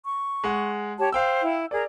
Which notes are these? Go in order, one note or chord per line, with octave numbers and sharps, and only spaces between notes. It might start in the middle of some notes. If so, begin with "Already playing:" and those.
C#6
G#3 F#5
G4 C#5 A5
C5 F5 G5 E6
E4
G#4 A#4 D5